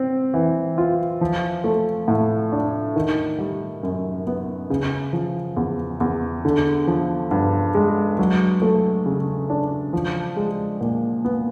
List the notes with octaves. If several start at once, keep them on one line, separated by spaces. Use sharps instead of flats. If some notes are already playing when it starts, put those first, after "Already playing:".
Already playing: C4
E3
F4
F3
A3
A2
D4
D#3
G3
F#2
B3
C#3
F3
E2
E2
D3
F3
G2
G#3
F#3
A3
C#3
D4
F3
G#3
A#2
B3